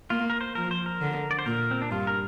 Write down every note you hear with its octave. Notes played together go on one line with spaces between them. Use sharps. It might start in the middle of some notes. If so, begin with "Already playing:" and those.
A#3 F4
A#4
C5
F3 A#4
C5
A#4
D3
D5
C5
A#2 A#4
C4
D4
G2 F4
A#4